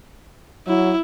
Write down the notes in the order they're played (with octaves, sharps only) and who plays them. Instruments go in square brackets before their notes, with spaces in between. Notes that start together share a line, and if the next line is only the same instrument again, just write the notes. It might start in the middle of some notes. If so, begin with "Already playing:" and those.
[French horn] F#3 [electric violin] E4